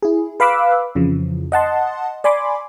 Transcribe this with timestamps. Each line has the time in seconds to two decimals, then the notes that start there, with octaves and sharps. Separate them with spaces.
0.03 E4 G#4
0.40 B4 F5 B5 D6 E6 F#6
0.95 F2 C#3 E3 F3
1.52 D#5 F#5 A5 C6
2.24 D5 G#5 B5 C6 D6